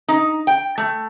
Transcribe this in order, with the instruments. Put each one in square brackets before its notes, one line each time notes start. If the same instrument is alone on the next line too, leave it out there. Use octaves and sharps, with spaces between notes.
[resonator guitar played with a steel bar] D#4
G5
A3